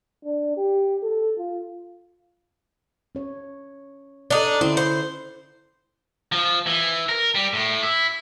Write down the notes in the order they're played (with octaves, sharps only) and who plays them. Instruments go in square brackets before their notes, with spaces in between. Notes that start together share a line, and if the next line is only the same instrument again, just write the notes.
[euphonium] D4
G4
A4
F4
[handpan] C#4 C#5
[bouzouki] D4 D#4 [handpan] A4 D5
[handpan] D3 C#4 E4 [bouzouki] C4
[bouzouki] C5
[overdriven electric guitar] F3
E3
A#4
G3
A2
E4